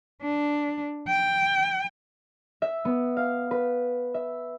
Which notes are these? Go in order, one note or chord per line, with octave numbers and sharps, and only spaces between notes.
D4
G5
E5
B3
F5
B4
E5